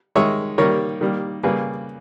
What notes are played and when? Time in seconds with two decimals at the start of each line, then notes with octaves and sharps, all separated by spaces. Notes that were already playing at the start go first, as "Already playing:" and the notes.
0.15 D#3 G#3 C#5 E5
0.58 D#3 G3 A#3 A#4 C#5
1.01 D#3 G3 A#3
1.43 C#3 G3 A#3 G#4 B4